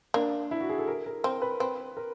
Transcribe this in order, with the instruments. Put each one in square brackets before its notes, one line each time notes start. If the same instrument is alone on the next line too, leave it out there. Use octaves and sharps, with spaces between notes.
[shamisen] A#3 [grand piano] D4
[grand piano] E4
F#4
G#4
A4
A#4
A#4
[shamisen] C4 [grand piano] A#4
[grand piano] B4
[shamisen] C4 [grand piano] B4
[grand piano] A#4